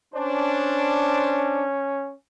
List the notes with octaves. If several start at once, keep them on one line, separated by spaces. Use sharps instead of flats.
C#4 D4 C5